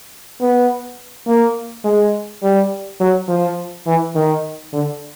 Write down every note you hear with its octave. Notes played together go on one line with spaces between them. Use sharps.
B3
A#3
G#3
G3
F#3
F3
E3
D#3
D3